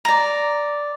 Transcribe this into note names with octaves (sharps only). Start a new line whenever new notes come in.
D5 A#5